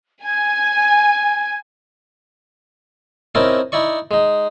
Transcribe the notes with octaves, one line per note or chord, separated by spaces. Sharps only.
G#5 G#6
C4 C#4 D#4 E4 A#4 A5
D#4 E4 D5 C#6
G#3 D#4